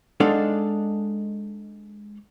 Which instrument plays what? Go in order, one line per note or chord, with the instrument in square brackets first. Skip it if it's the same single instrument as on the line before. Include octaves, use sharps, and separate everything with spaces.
[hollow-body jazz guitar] G#3 D4 D#4 A4 F5 F#5